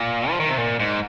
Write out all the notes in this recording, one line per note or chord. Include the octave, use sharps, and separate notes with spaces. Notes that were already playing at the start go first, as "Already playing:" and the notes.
Already playing: A#2
F3
D#3
C3
A#2
G#2